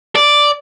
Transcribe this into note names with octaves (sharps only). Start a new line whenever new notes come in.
D5